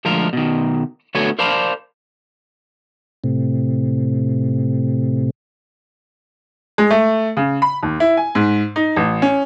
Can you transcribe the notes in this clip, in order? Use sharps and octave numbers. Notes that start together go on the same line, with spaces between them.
D2 F3 G#3 A#4
B2 D#3
D2 A3 B3 F#4 C#5 G#5
A#4 C5 D5 F5 A5 B5
A2 C3
G#3
A3
C#3
B5
D#2
E4
G#5
G#2
D#4
A1
C#4